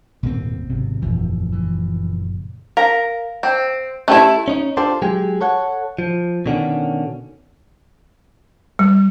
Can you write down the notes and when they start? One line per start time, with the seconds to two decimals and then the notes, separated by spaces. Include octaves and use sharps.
0.23 D#1 G#1 B2 A#3 C4
0.70 G#1 C3
1.02 F#1 E2 A#2 E3 F3
1.52 E3
2.77 A#4 F5
3.43 C4
4.08 A3 C#4 E4 G4 A5
4.48 C#4 D#4
4.77 D4 F4 G4 A4 C5
5.02 F#3 G#3 G4 G#4
5.41 A4 C#5 F#5
5.99 F3
6.46 B2 D3 D#3 C#4
8.79 G3